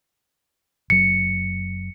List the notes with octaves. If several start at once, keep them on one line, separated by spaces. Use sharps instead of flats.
F#1 F#3 C#7